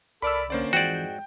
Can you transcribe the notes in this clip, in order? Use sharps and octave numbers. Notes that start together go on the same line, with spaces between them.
C2 A4 A#4 D5 B5 E6
D3 A#3 C#4 C5 D5
F2 G#2 E3 G#3 F#4 C5 D5 G5